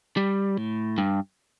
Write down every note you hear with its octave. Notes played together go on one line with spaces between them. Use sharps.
G3
A2
G2